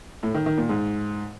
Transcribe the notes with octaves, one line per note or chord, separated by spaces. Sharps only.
A2
D#3
D#3
A#2
G#2